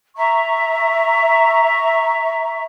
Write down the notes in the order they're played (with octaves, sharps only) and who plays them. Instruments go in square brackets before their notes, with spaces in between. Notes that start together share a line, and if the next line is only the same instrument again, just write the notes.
[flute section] E5 A#5 C#6